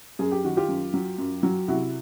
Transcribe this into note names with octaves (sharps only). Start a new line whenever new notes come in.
F#2 G#4
G4
D#3 F#4
F4 G4
F#2
F#3
F#2
F#3
C3 E4 F#4